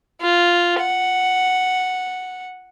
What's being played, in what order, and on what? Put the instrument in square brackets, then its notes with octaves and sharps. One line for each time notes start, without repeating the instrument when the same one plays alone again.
[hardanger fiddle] F4
F#5